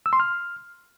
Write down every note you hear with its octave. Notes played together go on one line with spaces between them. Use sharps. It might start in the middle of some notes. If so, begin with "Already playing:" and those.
E6
C6
F6